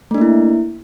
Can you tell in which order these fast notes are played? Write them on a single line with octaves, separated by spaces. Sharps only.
A3 D4 A#3 E4